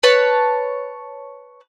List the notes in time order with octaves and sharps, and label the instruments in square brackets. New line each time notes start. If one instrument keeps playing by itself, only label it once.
[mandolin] B4 C#5 A5